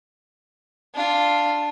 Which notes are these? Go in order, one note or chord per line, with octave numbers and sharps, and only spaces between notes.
D4 F4